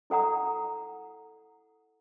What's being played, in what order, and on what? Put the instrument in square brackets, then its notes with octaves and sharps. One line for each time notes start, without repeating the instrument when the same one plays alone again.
[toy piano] E4 A4 F#5 A#5 D#6